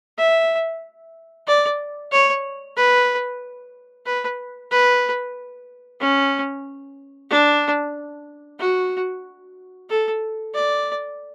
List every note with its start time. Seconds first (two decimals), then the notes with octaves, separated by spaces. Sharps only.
0.18 E5
1.47 D5
2.12 C#5
2.77 B4
4.06 B4
4.71 B4
6.01 C#4
7.30 D4
8.59 F#4
9.90 A4
10.54 D5